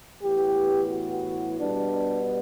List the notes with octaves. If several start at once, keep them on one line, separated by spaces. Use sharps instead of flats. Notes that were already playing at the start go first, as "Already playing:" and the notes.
A2 E3 B3 G4
F#4
B2 G3 B3 D4